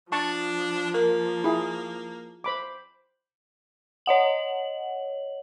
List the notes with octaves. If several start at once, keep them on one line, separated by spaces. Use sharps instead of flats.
F3 D4 A5 C#6
A#3 A#4
E4 G#4 E5
C5 B5 D6
C#5 D#5 F#5 F#7